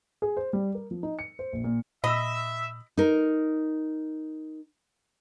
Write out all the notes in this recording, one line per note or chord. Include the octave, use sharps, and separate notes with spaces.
G#4
C5
G3
A#4
F3
D#4
C#7
C5
A#1
A#2
A#2 D#5 E5 B5 E6
D#4 A#4